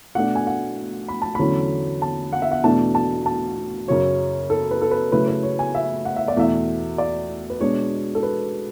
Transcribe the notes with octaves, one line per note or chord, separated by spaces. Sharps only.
B2 A3 D4 F#5
G#5
F#5
B5
A5
E2 D3 F#3 A3 C#4 B5
A5
F#5
E5
F#5
E2 B2 A3 D4 A5
A5
A5
F#2 C#3 F#3 C#4 C#5
A4
B4
A4
B4
C#3 F#3 A3 E4 B4
B4
C#5
G#5
E5
F#5
E5
D5
E2 B2 A3 E5
D5
B4
B2 G#3 D4 C#5
A4
B4